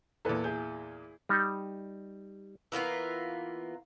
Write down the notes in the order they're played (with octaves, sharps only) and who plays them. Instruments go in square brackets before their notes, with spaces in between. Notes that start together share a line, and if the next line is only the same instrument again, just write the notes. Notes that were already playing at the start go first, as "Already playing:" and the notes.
[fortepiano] E2 A#2 [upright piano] A4 B4
[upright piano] E4 G#4 G6
[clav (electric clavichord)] G3 D#4
[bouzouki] E3 A#3 B3 F4